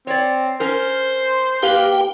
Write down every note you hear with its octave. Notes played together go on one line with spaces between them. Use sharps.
C4 C#5 D5
C#4 A#4 C5
A#3 G4 B4 F5 G5